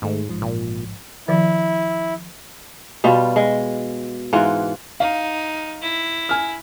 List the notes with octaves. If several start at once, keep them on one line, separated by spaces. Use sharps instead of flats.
G#2 D#3 A3
A1 G#2 F3
A#2
D#3 F3 E4
B2 G3 F4
G#3
G#2 E3 F4 F#5
D#4 F5
E4
G#5 F6